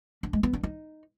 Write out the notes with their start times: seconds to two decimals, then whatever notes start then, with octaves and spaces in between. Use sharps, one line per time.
0.23 D4
0.33 G#3
0.43 B3
0.53 D4
0.63 D#4